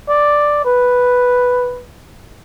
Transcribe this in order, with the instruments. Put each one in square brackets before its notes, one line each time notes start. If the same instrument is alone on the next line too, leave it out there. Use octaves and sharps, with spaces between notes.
[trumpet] D5
B4